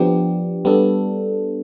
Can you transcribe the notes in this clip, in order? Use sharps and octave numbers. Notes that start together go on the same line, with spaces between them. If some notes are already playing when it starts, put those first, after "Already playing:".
Already playing: F3 B3 D4 G4
G3 B3 D4 A4